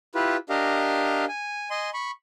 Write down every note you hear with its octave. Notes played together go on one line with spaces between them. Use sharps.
E4 F4 G4 B4
D4 G4 A#4 D#5 F5
G#5
D#5 G#5 C6
B5 C#6